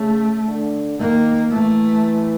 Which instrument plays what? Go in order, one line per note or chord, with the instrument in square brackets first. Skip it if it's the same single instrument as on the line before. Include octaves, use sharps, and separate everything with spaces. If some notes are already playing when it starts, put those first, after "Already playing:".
Already playing: [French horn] C#3 [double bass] A3
[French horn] D3
[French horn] D#3 [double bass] A#3
[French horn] E3 [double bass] A3